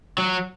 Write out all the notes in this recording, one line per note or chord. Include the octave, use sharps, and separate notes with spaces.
F#3